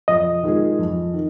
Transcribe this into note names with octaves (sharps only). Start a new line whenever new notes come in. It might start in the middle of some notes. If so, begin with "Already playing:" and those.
F2 D#5
D#3 G#3 F4 G#4
F2
D#3